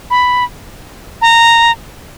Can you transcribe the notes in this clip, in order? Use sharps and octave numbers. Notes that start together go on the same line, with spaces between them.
B5
A#5